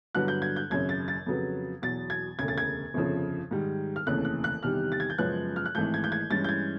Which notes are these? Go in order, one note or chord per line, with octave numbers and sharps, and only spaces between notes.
G2 D3 F#3 B3 F#6
G6
G#6
G6
G#1 F#2 C#3 G#6
A6
A6
F2 C#3 F#3 B3
E2 B2 F#3 A6
G#6
E1 D2 C#3 G#6
A6
G#6
G1 F2 C#3 F3
G#2 D#3 G3
F6
F1 D#2 C#3 E3 A3 F#6
F#6
F#6
E2 C3 D#3 G3 F6
A6
G#6
G6
F#2 C#3 F3 G#3 B3 F#6
F6
F#6
G#1 G#2 E3 A3 G6
G#6
G6
G#6
G2 E3 G#3 C#4 A6
G6
G#6